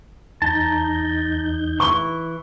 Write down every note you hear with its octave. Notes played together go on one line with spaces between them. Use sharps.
E2 D#4 A5 A#5 G6
E3 E4 C#6 G7